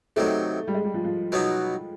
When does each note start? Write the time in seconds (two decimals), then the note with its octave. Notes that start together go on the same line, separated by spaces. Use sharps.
0.16 C3 D#3 F#3 A3
0.67 G3
0.74 G#3
0.84 G3
0.94 F3
1.04 F3
1.32 B2 F#3 B3 D#4